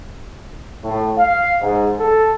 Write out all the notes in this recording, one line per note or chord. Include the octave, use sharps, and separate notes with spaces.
A2
F5
G#2
A4